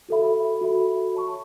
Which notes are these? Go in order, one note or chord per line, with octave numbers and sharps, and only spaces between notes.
F#4 A4 E5 B5
F#4 A4 E5 B5
C#5 A5 C#6